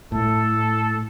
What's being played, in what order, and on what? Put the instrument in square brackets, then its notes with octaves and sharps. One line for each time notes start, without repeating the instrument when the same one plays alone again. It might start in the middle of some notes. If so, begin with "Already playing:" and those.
[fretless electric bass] A2 [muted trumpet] A4